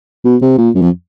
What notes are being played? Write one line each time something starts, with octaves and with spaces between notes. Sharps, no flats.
B2
C3
A#2
F#2
F2